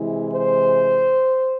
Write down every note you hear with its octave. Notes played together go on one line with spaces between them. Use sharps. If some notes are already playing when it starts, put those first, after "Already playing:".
Already playing: C3 E3 G#3 E4
C5